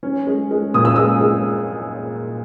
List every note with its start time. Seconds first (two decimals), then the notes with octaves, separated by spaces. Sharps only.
0.03 C#4
0.27 G#3
0.51 G#3
0.74 A#2 D#6
0.85 E6
0.96 G#3 D#6
1.21 G#3